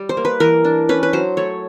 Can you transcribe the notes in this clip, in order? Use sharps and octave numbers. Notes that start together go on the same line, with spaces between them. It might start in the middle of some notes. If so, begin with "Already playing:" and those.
Already playing: G3
C5
A#3
B4
E3 A#4
D4
C#4 B4
B4
F#3 C5
A3 C#5